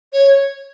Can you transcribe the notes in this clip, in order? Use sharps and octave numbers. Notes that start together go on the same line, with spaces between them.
C#5